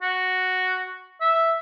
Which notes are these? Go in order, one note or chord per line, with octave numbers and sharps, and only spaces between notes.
F#4
E5